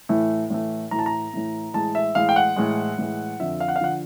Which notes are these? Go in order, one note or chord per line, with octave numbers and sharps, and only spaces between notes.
A2 E3 A3
A2 E3 A3
A2 E3 A3 A#5
A5
A#5
A2 E3 A3
A2 E3 G#3 A5
E5
A2 E3 G#3 F5
G5
F#5
A2 E3 G#3
A2 E3 G#3
F2 D3 F3 E5
F5
F#5
F5
D3 F3 F#5